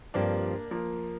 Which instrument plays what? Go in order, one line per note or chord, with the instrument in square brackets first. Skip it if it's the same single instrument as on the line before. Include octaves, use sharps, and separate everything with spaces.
[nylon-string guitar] G2 F3 C4 G4 [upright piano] A#3 D4
[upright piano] F3 A#3